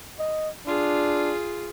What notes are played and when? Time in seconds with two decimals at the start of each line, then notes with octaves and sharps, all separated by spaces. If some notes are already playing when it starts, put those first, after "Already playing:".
0.19 D#5
0.66 D4 F4 G#4